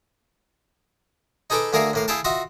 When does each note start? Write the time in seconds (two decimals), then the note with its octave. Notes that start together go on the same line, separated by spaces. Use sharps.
1.50 D#4 G#4 A4 B4 C#6 D6
1.73 D2 A#3 G#4 A#4 E5 F5
1.93 A2 A#3 F5
2.08 E4 G#4 E5 F5 G5 A5
2.25 F4 F#4 D#5 E5